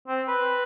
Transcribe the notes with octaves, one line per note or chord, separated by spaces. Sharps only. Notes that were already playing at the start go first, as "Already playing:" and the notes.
C4
B4